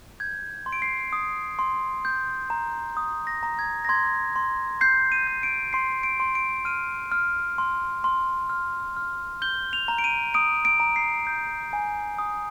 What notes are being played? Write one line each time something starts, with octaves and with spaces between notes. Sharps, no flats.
G6 G#6
C6
D7
C7
D#6
C6
G6
A#5
D#6
A#6
A#5
G#6
A#6
C6 G#6
C6
G6 C7
D#7
G6
D7
C6 C7
D7
C6
D7
F6 D#7
F6
C6
C6
F6
F6
G6 G7
F7
A#5
D7
D#7
D#6 D7
D7
A#5
C7
G6
G#5
D#6